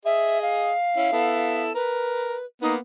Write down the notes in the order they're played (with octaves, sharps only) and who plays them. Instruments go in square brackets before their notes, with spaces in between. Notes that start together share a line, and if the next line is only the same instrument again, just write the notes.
[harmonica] G#4 D#5 [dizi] E5
[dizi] F5
[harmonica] C#4 E4
B3 E4 A4
[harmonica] A#4 [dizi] B4
[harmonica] A#3 B3 [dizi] D#4